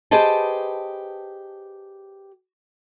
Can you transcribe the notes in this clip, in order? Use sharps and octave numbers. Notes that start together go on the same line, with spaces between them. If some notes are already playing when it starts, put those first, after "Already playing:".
G4 G#4 B4 C5 D#5 A5